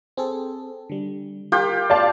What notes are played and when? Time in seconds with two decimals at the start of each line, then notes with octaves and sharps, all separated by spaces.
0.17 C4 G#4 A4
0.90 D3 G3
1.52 F4 G4 A#4 G5
1.90 D5 F5 A5